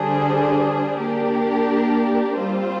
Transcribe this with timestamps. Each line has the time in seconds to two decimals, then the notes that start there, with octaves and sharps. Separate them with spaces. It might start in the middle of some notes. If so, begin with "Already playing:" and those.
Already playing: D3 G3 D4 G#4 C5
0.99 A#3 D4 G4 A#4
2.37 G3 C4 F4 C5